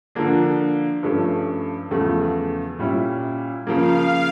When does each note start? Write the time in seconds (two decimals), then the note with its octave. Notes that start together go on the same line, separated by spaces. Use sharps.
0.15 D3 F3 A#3 D4
1.03 G2 F3 A3 C#4
1.91 E2 C#3 F3 A3
2.79 A#2 G3 C#4 E4
3.67 C#3 F3 A#3 F5